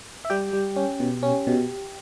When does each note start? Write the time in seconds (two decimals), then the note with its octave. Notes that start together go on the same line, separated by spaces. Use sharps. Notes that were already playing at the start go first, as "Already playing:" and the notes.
0.25 E5
0.30 G3 G4 G5
0.53 G3
0.76 C#4
1.00 B2
1.23 C#4
1.47 B2